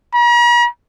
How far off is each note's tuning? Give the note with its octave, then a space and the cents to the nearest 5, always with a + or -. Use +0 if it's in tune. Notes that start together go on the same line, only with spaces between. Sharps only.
A#5 +45